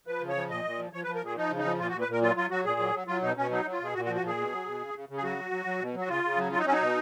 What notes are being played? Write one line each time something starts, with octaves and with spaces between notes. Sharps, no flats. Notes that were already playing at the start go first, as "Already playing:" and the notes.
F3 B4
C#3
C#5
F3
A#2 D#5
A#2
F3
F3 C#5
B4
F3
A#4
A#2 G#4
F3 D#4
C#3
D#4
F3
A#2 F4
F#4
A#2
B4
A#2 A#4
F#3 F4
F#3 F4
F#3 F#4
A#2 G#4
F#3
F#3
F#3 F4
B2 D#4
B2 C#4
F#3 D#4
F#3
F4
B2 G#4
A#2 F#4
F#4
F3
F#4
A#2 G#4
B2
F#3
B2
C#3
C#3
C#3
G#4
F#3 F#4
F#3
F#3
F#3
B2
F#3
F#4
C#3 F4
C#3
F#3
F#3 F4
D#4
F#3 C#4
D#4
B2